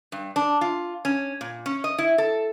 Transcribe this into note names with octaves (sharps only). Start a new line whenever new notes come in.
G2
D4
F4
C#4
A#2
C#4
D#5
E4
A4